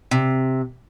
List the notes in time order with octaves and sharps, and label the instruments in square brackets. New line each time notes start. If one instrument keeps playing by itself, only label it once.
[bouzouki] C3